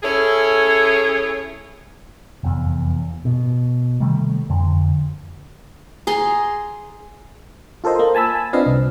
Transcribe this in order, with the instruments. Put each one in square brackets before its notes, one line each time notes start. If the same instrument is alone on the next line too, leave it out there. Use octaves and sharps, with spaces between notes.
[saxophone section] C#4 E4 G#4 A4 C#5
[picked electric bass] F1 E2
B2
C3 D#3 G3 A3
F2 D3
[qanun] G#4 A#5 C6
[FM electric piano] F4 A4 A#4 C5 D#5
A#3
G#5 A5 B5 E6
G#5
C4 D4 F4 B4 D#5 F5
C2